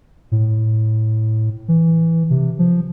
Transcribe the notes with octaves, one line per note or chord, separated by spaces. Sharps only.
A2
E3
C3
F3